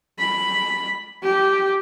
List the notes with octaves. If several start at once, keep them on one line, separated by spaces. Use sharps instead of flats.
B5
G4